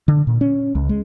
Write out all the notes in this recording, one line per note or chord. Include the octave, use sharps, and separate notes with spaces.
D3
A#2
C#4
C#2
G#3